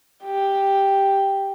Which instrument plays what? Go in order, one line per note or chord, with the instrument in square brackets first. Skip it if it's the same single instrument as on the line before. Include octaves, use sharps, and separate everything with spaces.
[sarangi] G4